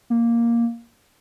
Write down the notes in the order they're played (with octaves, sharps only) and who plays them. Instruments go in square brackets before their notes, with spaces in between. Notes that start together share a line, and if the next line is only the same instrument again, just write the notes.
[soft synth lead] A#3